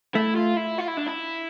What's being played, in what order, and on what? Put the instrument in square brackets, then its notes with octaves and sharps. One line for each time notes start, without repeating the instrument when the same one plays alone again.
[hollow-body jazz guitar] A3 [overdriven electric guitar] E4
[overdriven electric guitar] F4
E4
F4
E4
D4
E4